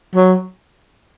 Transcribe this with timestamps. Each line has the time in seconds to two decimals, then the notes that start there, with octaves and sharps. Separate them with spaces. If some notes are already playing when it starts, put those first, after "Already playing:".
0.15 F#3